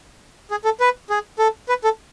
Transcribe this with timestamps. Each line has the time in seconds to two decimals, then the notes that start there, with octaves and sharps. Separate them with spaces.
0.51 G#4
0.65 A4
0.80 B4
1.10 G#4
1.39 A4
1.69 B4
1.84 A4